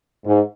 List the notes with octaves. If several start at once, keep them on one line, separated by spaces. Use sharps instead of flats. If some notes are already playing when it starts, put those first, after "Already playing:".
G#2